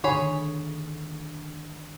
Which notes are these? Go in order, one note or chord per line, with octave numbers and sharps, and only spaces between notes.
D3 D#3 G#4 C#5 B5